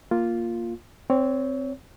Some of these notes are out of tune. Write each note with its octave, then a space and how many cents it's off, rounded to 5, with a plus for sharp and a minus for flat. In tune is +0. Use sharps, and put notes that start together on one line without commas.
A#3 +0 F4 +0
C4 +0 C#5 +25